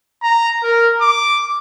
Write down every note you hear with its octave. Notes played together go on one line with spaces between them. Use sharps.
A#5
A#4
D6